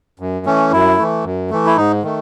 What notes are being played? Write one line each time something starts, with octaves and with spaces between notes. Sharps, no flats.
F#2
E3 A3 C#4
F#2 E4
E3 A3
F#2
E3 A3
E4
G#2 D#4
D#3 A3